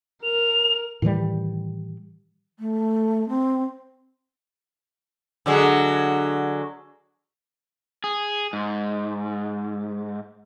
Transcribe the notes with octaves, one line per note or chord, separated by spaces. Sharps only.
A#4 F7
A2 D#3 E3 G3
A3
C4
D3 F#3 G#3
G#4
G#2